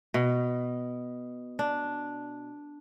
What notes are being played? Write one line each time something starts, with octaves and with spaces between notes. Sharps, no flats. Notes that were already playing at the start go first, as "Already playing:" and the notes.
B2
D4